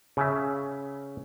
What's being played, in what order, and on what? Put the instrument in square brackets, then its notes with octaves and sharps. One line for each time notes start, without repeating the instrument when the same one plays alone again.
[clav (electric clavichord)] C#3 E5